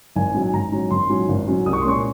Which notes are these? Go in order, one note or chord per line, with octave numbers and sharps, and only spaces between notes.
G#1 G#5
G#2 F#3 C#4
G#5
G#1 A#5
G#2 F#3 C#4
G#1 C6
G#2 F#3 C#4
G#1
G#2 F#3 C#4
C2 D#6
C#6
C6
A#2 G#3 C#4 C#6